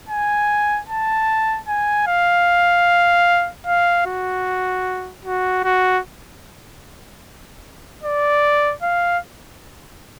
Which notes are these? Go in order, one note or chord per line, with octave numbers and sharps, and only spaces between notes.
G#5
A5
G#5
F5
F5
F#4
F#4
F#4
D5
F5